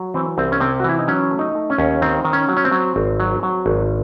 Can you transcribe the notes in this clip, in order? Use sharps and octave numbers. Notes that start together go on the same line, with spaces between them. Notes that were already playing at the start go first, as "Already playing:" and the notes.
Already playing: F#3
E3 C4
C2 C4
C#4
C3 C4
F#4
E3 E4
D#4
F#3 C#4
A3
D#4
A3
C#4
D#2
D#3 C4
D#3
C#4
F#3
C#4
C4
F#3
G#1
F#3
F#3
G#1